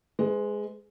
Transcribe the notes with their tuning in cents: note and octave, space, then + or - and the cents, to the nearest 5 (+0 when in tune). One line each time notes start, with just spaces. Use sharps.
G#3 +5 B4 +40